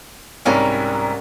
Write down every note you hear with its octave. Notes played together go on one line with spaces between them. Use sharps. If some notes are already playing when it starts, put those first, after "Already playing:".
C2 G#2 G3 C#4 A#4